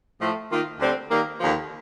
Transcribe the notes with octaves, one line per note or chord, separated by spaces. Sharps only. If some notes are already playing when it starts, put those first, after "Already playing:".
A2 F3 A3
D#3 A#3 F4
D2 D3 G3 C4
D#3 G3 A#3
D#2 D3 F3